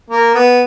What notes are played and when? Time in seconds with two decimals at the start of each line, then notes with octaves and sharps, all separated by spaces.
0.10 A#3
0.34 B3